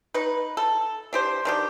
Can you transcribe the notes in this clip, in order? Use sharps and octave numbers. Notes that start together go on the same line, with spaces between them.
D#4 B4
A4
D4 G4 C5
D#3 D4 G4